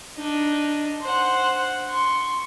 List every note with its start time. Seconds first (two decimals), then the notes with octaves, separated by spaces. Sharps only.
0.16 D4 D#4
1.02 C5 F#5
1.88 C6 C#6